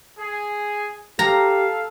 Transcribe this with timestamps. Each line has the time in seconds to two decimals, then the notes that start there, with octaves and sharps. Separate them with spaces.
0.19 G#4
1.19 G4 A4 F5 A#5